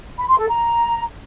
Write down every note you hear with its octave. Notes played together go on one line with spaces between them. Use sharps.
B5
C6
A4
A#5